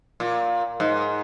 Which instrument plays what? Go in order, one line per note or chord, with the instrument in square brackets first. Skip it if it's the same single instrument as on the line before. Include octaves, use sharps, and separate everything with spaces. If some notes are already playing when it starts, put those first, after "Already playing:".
[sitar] A#2
G#2